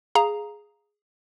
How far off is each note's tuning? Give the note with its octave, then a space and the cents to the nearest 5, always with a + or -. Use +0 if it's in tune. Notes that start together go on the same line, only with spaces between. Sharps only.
G#4 +0 F5 +0 A#5 +0